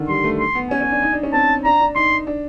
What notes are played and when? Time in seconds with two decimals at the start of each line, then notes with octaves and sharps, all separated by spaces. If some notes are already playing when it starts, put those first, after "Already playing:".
Already playing: D3 D#3
0.08 G3 C6
0.24 A3
0.39 C6
0.55 B3
0.71 C#4 G#5
0.81 C#4
0.91 D4
1.02 D#4
1.13 D4
1.23 C#4
1.33 C4 A5
1.64 D4 A#5
1.80 D4
1.96 D#4 C6
2.27 D4